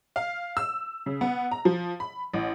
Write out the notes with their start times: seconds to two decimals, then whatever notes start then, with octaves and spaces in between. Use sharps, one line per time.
0.16 F5
0.57 E6
1.06 C#3
1.21 B3
1.51 A#5
1.65 F3
2.00 B5
2.34 A1